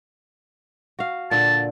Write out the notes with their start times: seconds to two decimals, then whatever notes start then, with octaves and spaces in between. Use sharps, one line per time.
0.99 F#4 F5
1.31 A#2 D3 D4 A5